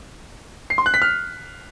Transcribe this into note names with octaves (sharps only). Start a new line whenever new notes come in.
C7
C6
F#6
B6
F6